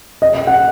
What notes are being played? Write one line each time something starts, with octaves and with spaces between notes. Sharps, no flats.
D#5
D#5
F#5